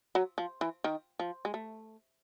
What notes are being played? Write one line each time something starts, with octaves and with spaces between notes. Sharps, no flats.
F#3
F3
E3
D#3
F3
G#3
A3